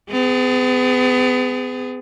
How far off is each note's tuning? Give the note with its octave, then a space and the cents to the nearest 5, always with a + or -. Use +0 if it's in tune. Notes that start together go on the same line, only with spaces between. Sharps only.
B3 +40 G#4 -5